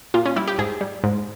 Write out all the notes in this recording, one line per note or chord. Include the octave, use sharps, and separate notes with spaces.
A#2 F4
C#4
G3 E4
G4
G#2 G#4
G3
G#2